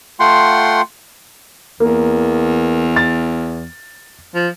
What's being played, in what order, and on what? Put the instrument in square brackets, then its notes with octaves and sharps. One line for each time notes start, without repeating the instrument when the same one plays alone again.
[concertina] A3 F4 F#5 G5 C6
[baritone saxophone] E2 [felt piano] A#3
[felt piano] A6
[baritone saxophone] F3